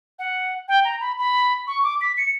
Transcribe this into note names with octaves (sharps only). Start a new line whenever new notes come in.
F#5
G5
A#5
B5
B5
C#6
D6
B6
C#7